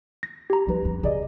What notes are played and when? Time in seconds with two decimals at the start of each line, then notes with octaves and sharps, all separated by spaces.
0.23 A#6
0.50 G4 A#5
0.67 F3 G3 E4 B4
0.82 F2 C#4
1.03 C#3 G#4 D5 D#5